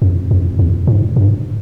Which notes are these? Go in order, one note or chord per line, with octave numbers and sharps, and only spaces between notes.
F2
F2
E2
G#2
G2